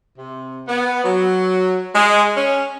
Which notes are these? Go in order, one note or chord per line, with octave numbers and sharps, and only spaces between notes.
C3
B3
F#3
G#3
C#4